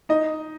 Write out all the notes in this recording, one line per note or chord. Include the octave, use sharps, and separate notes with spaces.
D#4 D#5